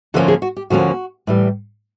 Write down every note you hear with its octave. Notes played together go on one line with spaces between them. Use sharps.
D2 D3 F3 A#3 C#4 A4
G#4
F#4
G4
D2 D3 F3 A#3 C#4 F#4
A2 E3 G3